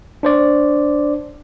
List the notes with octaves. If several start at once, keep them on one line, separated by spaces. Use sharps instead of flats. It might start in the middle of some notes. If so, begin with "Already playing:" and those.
D4 C5 D5